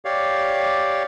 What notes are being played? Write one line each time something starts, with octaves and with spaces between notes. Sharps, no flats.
G4 C#5 D5 F5